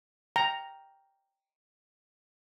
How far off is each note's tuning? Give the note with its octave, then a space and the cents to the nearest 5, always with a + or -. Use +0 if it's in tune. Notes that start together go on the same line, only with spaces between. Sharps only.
G5 +0 A#5 +0